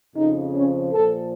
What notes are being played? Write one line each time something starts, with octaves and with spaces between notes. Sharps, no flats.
F2 C#3 F3 D#4
C#4
A#2 F3 A4